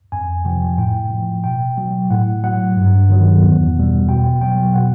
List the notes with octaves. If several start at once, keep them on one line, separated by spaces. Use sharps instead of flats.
F2 G#5
C3 F3 G5
A2 G5
F3
B2 G5
F#3
A2 F#5
F#3 F#5
G2
D#3 F#3
E2
B2 G3
B2 G5
F#3 G5
B2 F#5